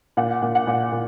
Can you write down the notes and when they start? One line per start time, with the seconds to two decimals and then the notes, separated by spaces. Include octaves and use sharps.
0.17 A#2 F#5
0.42 A#2
0.55 F#5
0.67 A#2
0.92 A#2